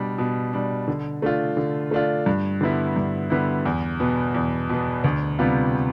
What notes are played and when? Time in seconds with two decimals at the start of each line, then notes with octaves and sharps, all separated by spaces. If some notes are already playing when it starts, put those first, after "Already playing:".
Already playing: B2 G3 D4
0.18 B2
0.53 G3 D4
0.88 D3
1.22 A3 D4 F4
1.57 D3
1.91 A3 D4 F4
2.26 G2
2.61 D3 G3 B3 E4
2.96 G2
3.30 D3 G3 B3 E4
3.65 E2
4.00 B2 B3
4.34 E2
4.69 B2 B3
5.04 D2
5.39 C3 G3 B3 F4